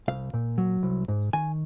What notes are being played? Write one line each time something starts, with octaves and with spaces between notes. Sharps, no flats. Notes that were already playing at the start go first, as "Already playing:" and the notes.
C2 F5
A#2
F#3
C2
G#2
D#3 G#5